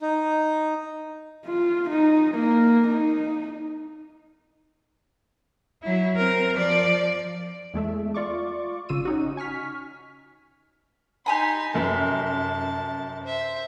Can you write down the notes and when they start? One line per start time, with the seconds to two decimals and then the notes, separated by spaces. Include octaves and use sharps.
0.01 D#4
1.46 F4
1.90 D#4
2.35 A#3
2.88 D#4
5.83 F#3 E4
6.17 C4 A#4
6.56 F3 D5
7.74 E2 G#3 A3 E5
8.14 F4 D5 C#6 D6
8.89 G#1 C#3 F4 E6 D#7
9.05 C#4 D#4 F#4
9.37 G#5 C#6 F6 B6
11.26 D#4 G4 G#5 B5 C6
11.74 F1 F#2 A5
13.23 C5 E5